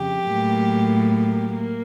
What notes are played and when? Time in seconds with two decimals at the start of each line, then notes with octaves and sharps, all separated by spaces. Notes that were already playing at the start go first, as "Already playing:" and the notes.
Already playing: F2 C#3 G4
0.26 A2 F#3 A#3
1.54 A#3